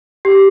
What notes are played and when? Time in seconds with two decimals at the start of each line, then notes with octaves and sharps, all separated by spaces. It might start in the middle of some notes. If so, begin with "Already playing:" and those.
0.25 G4